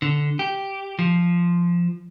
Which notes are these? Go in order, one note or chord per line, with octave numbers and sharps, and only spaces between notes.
D3
G4
F3